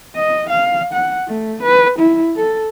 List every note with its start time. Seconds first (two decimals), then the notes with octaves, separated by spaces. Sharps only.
0.16 D#5
0.49 F5
0.93 F#5
1.28 A3
1.63 B4
1.99 E4
2.36 A4